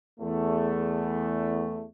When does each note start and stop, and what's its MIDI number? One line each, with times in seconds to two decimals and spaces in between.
0.20 1.84 40
0.20 1.84 57